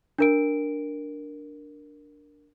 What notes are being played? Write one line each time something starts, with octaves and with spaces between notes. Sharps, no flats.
D4 A#4 D7